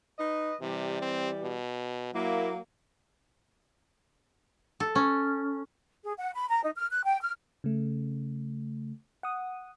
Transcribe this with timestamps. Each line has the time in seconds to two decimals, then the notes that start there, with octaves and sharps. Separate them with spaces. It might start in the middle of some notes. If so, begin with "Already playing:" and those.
0.18 D#4 B4 D#5
0.61 C3 E3 G3
1.02 C4
1.43 B2
2.14 F#3 A#3 E4
4.80 A4
4.95 C#4
6.03 G#4
6.19 F#5
6.34 B5
6.49 A#5
6.63 D#4
6.74 F6
6.90 F#6
7.05 G5
7.21 F6
7.64 C#3 A3
9.23 F#5 D#6